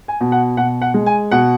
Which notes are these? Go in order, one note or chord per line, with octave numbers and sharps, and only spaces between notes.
G#5
B2
F#5
B2 F#5
F#5
G#3
G#5
B2 F#5